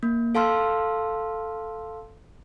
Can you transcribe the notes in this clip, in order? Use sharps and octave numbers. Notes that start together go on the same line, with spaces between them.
A#3
A4 F5 A5 C6 E6 F6